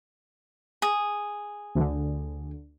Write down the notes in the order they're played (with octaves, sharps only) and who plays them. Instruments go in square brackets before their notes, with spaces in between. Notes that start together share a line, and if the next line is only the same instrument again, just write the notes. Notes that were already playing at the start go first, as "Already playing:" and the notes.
[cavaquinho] G#4
[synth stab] D2 D3